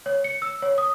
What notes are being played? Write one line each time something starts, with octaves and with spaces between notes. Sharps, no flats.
C#5
C#7
E6
C#5
D#6